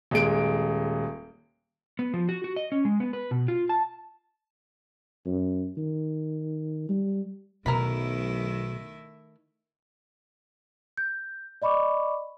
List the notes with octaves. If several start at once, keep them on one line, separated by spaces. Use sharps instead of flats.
D#1 G#3 D7
B3
F3
F#4
F#4
D#5
C#4
G#3
B3
B4
B2
F4
A5
F#2
D#3
G3
B1 B2 D#3 F#3 A3 E4 A#4 B5
G6
D5 D#5 B5 C#6 D6